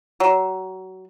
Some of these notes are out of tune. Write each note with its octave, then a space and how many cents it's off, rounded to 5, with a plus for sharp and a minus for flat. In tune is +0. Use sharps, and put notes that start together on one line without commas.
F#3 +25